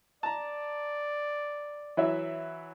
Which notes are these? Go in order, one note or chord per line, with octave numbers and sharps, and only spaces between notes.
D5 A5 A#5
E3 F#3 E5